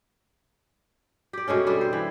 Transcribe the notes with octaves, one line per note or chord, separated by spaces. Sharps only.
G4 D5
B2 G#3 A3 C#4
G3 D4 A4
C5
E3